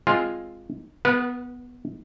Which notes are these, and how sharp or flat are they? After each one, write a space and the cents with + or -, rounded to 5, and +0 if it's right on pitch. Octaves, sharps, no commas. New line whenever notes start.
G#3 +0 C4 +0 F4 +0
B3 +0 B4 -30 F5 +45